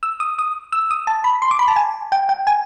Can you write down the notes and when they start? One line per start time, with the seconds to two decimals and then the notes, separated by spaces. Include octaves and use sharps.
0.03 E6
0.20 D#6
0.39 D#6
0.72 E6
0.91 D#6
1.07 A5
1.24 B5
1.42 C6
1.51 D6
1.59 B5
1.68 A5
1.76 G#5
2.12 G5
2.29 G5
2.47 G#5